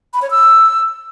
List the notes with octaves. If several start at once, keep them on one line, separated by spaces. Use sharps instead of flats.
B5
C#5
E6